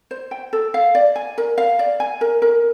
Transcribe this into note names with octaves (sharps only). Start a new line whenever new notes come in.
C5
G5
A4
F5
D5
G#5
A#4
F5
D5
G#5
A#4
A#4